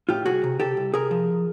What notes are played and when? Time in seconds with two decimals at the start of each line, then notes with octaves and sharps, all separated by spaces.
0.09 A2 F4 G4
0.26 C2 F#4 G#4
0.44 C3
0.60 C3 G4 A4
0.77 C2
0.94 C3 G#4 A#4
1.11 F3